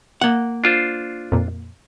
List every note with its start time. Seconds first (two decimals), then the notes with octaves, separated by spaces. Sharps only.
0.21 A#3 F#5
0.64 D4 F4 C5
1.32 F2 A#2